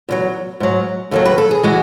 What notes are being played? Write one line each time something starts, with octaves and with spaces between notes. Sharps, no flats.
E2 D#3 F#3
G#2 F#3
D#2 D#3 F#3 A4
B4
A4
G#4
E3 G#3 F#4